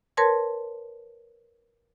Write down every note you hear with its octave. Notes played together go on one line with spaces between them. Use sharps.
A#4 B4 C#5 A5 C6 G#6